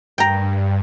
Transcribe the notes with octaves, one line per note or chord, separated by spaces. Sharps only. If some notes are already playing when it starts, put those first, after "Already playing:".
G2 G5 A#5